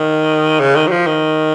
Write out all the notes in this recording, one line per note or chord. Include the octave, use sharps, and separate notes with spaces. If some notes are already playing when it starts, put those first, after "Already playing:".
Already playing: D#3
C#3
D#3
F#3
F3
D#3